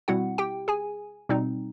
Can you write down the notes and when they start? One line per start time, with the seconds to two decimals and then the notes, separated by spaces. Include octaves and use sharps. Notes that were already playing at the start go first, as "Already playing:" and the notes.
0.08 B2 G3 C4 E4 F#4 F#5
0.38 G4 G5
0.68 G#4 G#5
1.29 B2 G3 C4 D#4